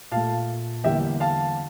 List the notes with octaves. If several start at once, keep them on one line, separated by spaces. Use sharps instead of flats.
A#2 A3 F5 A5
E2 D3 G3 A#3 E5 G5
F5 A5